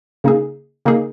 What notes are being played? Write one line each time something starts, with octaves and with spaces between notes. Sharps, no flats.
C#3 A#3 D#4 G#4
C#3 A#3 D#4 G#4